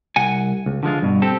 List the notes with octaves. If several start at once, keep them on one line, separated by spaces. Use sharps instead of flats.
C2 F#5 G#5
C#2
D3 F3 G#3 F4
G2 B2
C4 G4 A4